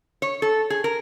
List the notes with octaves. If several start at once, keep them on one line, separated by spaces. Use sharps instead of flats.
C#5
A4
G#4
A#4